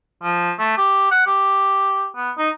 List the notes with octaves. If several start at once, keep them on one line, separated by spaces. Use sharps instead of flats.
F3
A3
G4
F#5
G4
B3
D#4